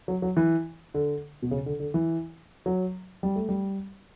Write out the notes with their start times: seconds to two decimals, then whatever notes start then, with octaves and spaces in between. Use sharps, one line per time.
0.08 F#3
0.22 F#3
0.37 E3
0.94 D3
1.42 B2
1.51 C#3
1.66 D3
1.80 D3
1.94 E3
2.66 F#3
3.23 G3
3.36 A3
3.49 G3